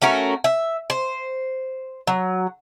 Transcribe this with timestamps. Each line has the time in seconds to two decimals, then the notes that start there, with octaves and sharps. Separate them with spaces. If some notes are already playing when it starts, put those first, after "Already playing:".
0.02 A3 C#4 F#4 A#4
0.44 E5
0.90 C5
2.07 F#3